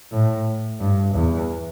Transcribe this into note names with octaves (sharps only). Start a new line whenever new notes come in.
A2
G2
E2